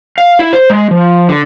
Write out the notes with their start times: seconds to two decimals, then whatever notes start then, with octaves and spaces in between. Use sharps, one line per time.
0.18 F5
0.39 E4
0.53 C5
0.70 G#3
0.91 F3
1.29 D3